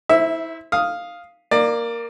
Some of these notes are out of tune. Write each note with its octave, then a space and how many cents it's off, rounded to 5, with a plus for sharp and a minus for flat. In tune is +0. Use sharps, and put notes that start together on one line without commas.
E4 -25 C5 +0 E5 +0
F5 +0 D#6 +0
A#3 +0 D5 +20